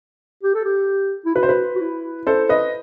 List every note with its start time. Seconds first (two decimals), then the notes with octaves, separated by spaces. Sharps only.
0.43 G4
0.54 A4
0.65 G4
1.25 E4
1.35 F#4 B4
1.43 C5
1.49 B4
1.75 F#4
1.81 E4
2.27 A4 C5
2.49 B4 D#5